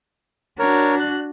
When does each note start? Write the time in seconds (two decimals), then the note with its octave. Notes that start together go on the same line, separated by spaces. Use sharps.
0.59 D4 F#4 A#4 C#5
1.00 F#6